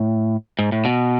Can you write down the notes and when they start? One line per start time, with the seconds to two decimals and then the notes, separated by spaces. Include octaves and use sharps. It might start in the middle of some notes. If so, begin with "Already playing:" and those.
Already playing: A2
0.59 G#2
0.72 A2
0.85 B2